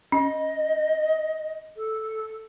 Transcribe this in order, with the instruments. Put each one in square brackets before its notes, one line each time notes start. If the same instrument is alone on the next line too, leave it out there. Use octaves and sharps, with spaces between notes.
[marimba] C#4 [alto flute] D#5
[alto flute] A4